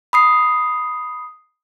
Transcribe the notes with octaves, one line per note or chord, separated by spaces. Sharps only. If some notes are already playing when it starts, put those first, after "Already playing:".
B5 D#6 C7